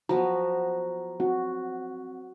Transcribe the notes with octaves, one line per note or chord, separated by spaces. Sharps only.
F3 B3 F#4 A#5
C4 F#4